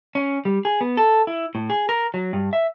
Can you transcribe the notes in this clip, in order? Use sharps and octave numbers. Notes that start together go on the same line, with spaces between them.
C#4
G3
G#4
B3
A4
E4
A2
G#4
A#4
F#3
G2
E5